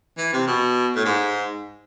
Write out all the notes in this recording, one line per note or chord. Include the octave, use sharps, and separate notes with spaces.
E3
C3
B2
A2
G#2